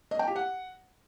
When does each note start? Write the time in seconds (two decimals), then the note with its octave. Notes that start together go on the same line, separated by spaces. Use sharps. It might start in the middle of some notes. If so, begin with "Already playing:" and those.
0.11 D#5
0.19 G5
0.27 G4
0.36 F#5